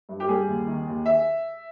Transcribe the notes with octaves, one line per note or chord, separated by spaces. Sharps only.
G2
G4
G3 G#4
D#2
D#3
D#2
E5